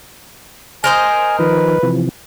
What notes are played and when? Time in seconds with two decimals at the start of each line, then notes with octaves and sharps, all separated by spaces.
0.84 A#4 C5 D#5 G#5
1.39 D#3 F3 B4
1.83 C3 E3 F3